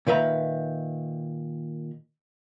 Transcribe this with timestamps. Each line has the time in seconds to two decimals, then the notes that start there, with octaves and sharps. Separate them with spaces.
0.07 A#2 D#3 B4 E5 A#5